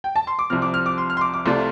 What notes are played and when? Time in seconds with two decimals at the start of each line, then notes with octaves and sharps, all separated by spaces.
0.04 G5
0.16 A5
0.27 C6
0.39 D6
0.50 C2 C3 F3 C4 F6
0.62 D6
0.74 F6
0.86 D6
0.98 C6
1.10 F6
1.17 C6
1.21 D6
1.34 D6
1.46 C2 C3 A3 F4 D5 C6